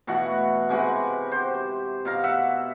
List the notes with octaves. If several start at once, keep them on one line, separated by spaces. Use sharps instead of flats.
B2 E3 A3 F#4
C3 G#3 F#4 B4
G4 C5
C5
B2 F5 A#5
E5 F#5